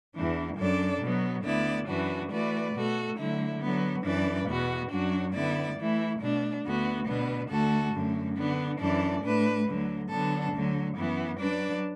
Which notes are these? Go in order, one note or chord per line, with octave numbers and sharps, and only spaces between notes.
E2 E3 D4
F#2 F#3 D4 A4 D5
B2 F#3 B3
D2 D3 B3 E4 D5
F#2 E3 D4 F#4 B4
E3 A3 F#4 B4 D5
B2 A3 F#4 A4
D3 F#3 A3 E4
D3 F#3 B3
F#2 E3 D4 B4 D5
E2 B2 B3 F#4
F#2 F#3 D4 F#4
D3 B3 E4 D5
E3 A3 E4
B2 A3 D4
D2 D3 B3 F#4
B2 B3 D4 B4
D2 D3 A3 F#4 A4
F#2 D3 A3
D3 B3 D4
F#2 E3 D4 A4 D5
A2 A3 D4 B4
D2 D3 F#3
D3 F#3 B3 D4 A4
D2 D3 F#3
F#2 E3 B3
F#3 D4 B4 D5